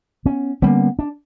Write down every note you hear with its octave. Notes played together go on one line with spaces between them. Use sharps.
B3 C#4
D3 G3 A#3 B3 C#4
D4